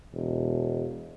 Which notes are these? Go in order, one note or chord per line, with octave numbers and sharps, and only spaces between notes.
E1